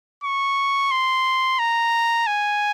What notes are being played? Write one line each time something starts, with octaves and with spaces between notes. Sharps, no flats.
C#6
C6
A#5
G#5